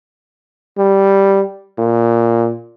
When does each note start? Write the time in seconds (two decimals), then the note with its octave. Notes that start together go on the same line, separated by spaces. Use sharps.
0.78 G3
1.78 A#2